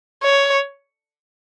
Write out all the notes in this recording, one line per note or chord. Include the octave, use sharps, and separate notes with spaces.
C#5